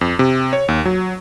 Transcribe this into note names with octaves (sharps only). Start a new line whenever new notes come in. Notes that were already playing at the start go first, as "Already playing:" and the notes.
F2
C3
C#5
D#2
F#3